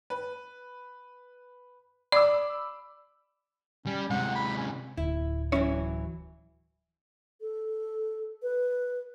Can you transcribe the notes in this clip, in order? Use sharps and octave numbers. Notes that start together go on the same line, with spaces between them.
B4
D5 B5 D6 E6
G3 C#4
C3 G#3 F#5
B5
C#4
D1 E4
E3 F#3 C#4 E4 C#5
A4
B4